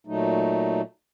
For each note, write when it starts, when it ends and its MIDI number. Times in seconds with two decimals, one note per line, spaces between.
0.07 0.81 46
0.07 0.81 54
0.07 0.81 57
0.07 0.81 63